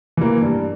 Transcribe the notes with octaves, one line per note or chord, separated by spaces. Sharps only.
E3 A#3
G2